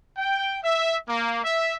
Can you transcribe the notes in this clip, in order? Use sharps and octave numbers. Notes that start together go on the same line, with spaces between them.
G5
E5
A#3
E5